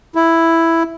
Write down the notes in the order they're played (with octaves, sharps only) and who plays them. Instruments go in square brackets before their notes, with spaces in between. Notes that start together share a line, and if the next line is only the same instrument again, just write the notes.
[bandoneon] E4